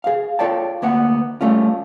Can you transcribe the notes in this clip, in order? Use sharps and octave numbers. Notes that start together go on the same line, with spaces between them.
G#4 F5
F4 A4 C#5 D5 G5 A5
D2 A#3 B3 F#5
G3 A3 C#4 F4